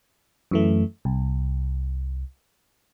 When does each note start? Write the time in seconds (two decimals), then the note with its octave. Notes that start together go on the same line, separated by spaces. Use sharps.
0.51 F#2 E3 A3
1.05 C2